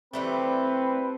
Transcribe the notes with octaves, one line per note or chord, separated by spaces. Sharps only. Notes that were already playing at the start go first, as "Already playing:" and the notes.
E3 G3 A3 C4 B4